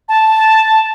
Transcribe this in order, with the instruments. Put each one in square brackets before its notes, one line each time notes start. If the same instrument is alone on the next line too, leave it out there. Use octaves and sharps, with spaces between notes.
[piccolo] A5